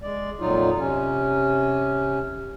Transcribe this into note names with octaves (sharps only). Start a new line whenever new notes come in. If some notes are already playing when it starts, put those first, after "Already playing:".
G#3 D5
F2 A#2 F#3 D#4 F4
C3 C#4